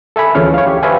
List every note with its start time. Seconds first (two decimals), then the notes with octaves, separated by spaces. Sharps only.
0.16 A4 E5 G#5 B5
0.35 D2 E3 F3 C#4 G#4 F6
0.54 C#5 F5
0.67 G4
0.83 G4 B4 C5 E5 F5 G#5